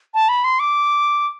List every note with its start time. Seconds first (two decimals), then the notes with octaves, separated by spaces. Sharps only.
0.14 A5
0.29 B5
0.44 C6
0.60 D6